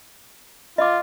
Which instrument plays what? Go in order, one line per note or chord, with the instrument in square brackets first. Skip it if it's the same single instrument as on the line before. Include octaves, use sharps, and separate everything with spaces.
[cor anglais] F4 [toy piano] D#5 D6